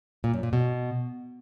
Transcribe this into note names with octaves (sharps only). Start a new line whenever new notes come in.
A#2
F#2
A#2
B2